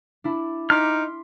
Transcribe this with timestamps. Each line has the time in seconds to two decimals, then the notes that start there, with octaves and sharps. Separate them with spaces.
0.24 D4 E4
0.70 D#4 C6 D6 F6 B6